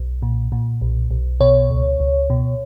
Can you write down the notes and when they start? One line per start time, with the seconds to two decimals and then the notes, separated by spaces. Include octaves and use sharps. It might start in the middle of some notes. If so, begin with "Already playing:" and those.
Already playing: B1
0.22 A#2
0.52 A#2
0.81 B1
1.11 B1
1.40 B2 C#5
1.70 C#2
2.00 C#2
2.30 B2